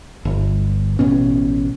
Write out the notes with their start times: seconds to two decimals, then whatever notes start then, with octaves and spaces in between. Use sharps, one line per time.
0.25 G1
0.99 A1 B2 B3 C#4